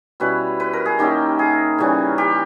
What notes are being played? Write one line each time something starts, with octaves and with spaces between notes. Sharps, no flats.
B2 G3 C#4 E4 B4
B4
A#4
G#4
D#3 A#3 C#4 E4 G4
G#4
C#3 E3 G3 C#4
G4